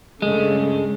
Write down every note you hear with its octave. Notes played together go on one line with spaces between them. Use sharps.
G2 C#3 G#3 A3